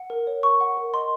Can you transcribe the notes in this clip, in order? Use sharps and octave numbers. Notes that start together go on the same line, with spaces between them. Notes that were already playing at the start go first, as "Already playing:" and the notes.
Already playing: F#5
A#4
C#5
A#4 C#6
F#5
A#4
D#5 C6